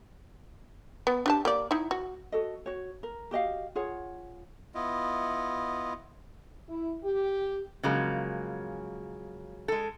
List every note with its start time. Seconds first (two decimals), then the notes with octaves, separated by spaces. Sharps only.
1.07 B3
1.26 D4 G4 A5
1.45 A#3 G4 D5
1.71 D#4 E4
1.91 F#4
2.32 F#4 A4 D#5
2.66 F#4 C#5
3.03 A#4
3.31 F#4 G4 D#5 F5
3.75 F4 G#4 C#5 F#5
4.74 B3 E4 F4 D#5
6.68 E4
7.03 G4
7.83 C#3 F3 F#3 G#3 A#3
9.68 G#3 A4